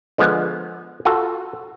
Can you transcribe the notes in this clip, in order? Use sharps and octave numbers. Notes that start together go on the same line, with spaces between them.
D3 F3 G#3 B3
F4 F#4 A4